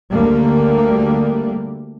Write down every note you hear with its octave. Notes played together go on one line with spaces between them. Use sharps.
D2 D3 G3 A#3